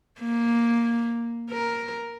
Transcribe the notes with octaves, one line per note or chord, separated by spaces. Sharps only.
A#3
A#4